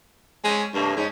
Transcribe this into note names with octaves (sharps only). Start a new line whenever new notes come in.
G#3 C4 C#4
G2 C3 A3 A#3
G#2 C#4 D#4